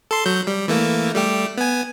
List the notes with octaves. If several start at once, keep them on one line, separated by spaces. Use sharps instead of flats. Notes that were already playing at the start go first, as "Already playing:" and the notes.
A4 C6
F#3 G6
G3
E3 A3 A#3
G3 A3 G4
B3 G#5